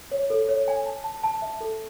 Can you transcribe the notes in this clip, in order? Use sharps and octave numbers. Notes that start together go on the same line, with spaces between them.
C#5
A4
C#5
G#5
A5
A5
A5
E5
A4